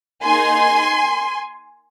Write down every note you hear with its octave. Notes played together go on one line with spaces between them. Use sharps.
A#3 D#4 G#4 G#5 C6